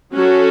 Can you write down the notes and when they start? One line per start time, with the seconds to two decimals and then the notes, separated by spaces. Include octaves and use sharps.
0.13 F#3 C#4 F#4 A4